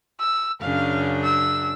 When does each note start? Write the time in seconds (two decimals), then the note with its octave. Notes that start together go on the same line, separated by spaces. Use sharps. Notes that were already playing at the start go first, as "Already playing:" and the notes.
0.20 E6
0.62 F#2 C#3 D4 F5
1.24 E6